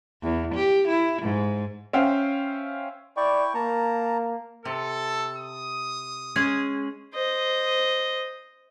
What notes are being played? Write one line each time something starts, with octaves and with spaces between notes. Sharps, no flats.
E2
G4
E4
G#2
C#4 C5 E5 F5 G5
E4 D5 G5 C#6
A#3 A5 A#5
C3 A4
D#6
G#3 C#4 G#4
C5 D#5